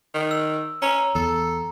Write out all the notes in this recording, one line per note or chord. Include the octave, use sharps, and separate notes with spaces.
D#3
E6
C#4 A#5
E2 A4